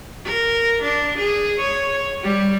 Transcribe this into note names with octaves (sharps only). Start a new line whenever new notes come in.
A#4
D4
G#4
C#5
G3